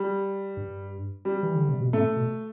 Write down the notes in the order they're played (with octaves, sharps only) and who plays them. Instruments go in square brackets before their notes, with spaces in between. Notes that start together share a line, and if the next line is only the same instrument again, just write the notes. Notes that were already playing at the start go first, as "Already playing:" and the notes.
Already playing: [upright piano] G3
[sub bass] G2
[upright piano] G3
[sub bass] E3
D3
C3
B2
[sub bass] A2 [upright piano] A3
[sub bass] B2